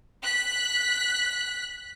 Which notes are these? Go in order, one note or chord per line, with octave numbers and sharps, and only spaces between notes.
F#6 B6